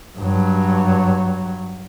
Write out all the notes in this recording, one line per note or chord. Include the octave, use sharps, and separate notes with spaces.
G2 F#3